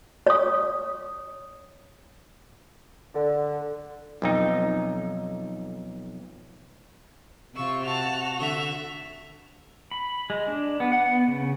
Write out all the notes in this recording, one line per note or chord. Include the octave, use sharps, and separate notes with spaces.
C#5 D#6
D3
B1 F2 D#4
C3 F4 C#6 E6
F#4 A5 F7
D3 E5
B5
G#3
D4
B3
F#5
B3
C#3